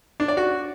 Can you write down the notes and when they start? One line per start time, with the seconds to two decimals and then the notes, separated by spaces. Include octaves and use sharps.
0.20 D4
0.28 D5
0.37 F#4